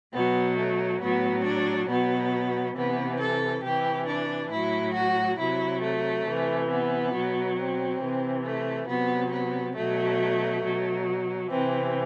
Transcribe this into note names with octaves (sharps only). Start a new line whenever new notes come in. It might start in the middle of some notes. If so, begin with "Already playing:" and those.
B2 F#3 B3
A3
A2 F#3 B3
D4
B2 F#3 B3
C3 E3 B3
A4
C3 E3 G4
D4
A2 F#3 E4
F#4
C3 F#3 E4
A3
C3 E3
B3
B2 F#3
C4
C3 E3
A3
C3 F#3 B3
B3
B2 F#3 A3
B2 F#3
C3 E3 C4